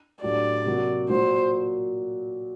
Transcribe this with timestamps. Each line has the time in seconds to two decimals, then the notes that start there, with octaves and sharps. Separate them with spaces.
0.22 A2 F#3 A3 D4 G4 D5
0.66 C3 F#3 A#3 F#4
1.09 A#2 F#3 A#3 F#4 C5